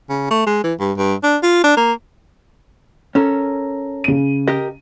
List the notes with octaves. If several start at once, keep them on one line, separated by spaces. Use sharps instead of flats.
C#3
A3
G#3
E3
G2
G2
D4
F4
D4
A#3
C#4 A4 A#4
C#3 D#7
G4 A#4 D#5